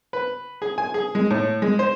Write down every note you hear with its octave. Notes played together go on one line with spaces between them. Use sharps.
B4
G#4
G#5
G#4
G#3
A2
G#3
C5